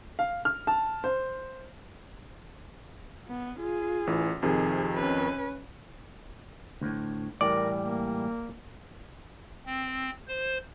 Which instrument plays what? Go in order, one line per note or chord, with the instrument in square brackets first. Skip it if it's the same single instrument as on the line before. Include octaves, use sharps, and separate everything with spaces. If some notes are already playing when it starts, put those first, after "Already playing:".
[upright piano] F5
F6
A5
C5
[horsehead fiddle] B3
F4 G#4
[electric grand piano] A1 E3
[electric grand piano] F2 C3 D#3 [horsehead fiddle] G#4
[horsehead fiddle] C#4 B4
[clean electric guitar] D2 A2
[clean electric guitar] A2 E3 G3 [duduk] A#4 [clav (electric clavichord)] D5
[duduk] A#3
[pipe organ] C4
C5